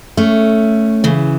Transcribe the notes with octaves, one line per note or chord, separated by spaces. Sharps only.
A3 C#4
C#3 E3